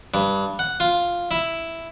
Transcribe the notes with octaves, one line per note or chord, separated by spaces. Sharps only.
G2
F#5
F4
E4